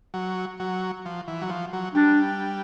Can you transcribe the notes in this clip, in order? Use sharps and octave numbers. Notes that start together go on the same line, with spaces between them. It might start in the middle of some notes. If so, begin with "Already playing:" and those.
F#3
F#3
F3
E3
F#3
F3
F#3
G3 D4